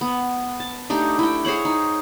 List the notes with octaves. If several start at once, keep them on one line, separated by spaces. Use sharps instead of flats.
B3
A5
A3 D4 D#4 G4
E4 G5
G#4 C5 C#5 F#5
D#4